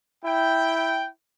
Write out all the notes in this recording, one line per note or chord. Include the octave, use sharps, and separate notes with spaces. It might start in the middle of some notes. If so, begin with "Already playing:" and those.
E4 G5